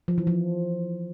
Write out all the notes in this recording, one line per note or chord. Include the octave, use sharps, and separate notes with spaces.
F3
E3
F3